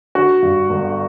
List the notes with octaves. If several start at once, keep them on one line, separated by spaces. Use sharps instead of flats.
D3 F#4
G2
G1